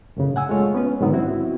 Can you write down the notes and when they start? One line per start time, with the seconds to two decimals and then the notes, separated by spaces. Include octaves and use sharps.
0.17 F#2 A2 C#3
0.36 F#5 G#5 E6
0.49 G#3 A3 F4 C#5
0.74 B3 C#4 B4
1.01 G#2 D3 D#3 F#3 B3
1.13 C4 E4 F#4